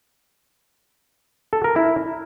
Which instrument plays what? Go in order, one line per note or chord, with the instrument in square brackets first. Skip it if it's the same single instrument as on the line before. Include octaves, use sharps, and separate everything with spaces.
[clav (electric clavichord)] A4
A#4
E4